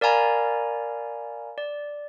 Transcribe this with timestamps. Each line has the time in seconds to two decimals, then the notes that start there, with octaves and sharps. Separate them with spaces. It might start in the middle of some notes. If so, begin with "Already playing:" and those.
0.01 A#4 D5 F5 G#5 A#5 B5
1.58 D5